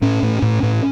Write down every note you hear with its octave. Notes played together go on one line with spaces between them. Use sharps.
A2 C#4
A2
A2
A2